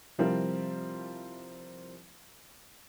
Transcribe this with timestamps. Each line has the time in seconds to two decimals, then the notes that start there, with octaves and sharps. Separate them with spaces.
0.18 C3 F3 G3 C4 E4 A#4